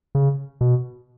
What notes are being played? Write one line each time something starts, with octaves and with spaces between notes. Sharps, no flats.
C#3
B2